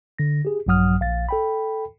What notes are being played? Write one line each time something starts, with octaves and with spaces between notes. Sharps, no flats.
D3 A#6
G4 G#4
A#1 G2 F#3 F#5 D#6 F6
A#1 F5 A6
A4 G5 B5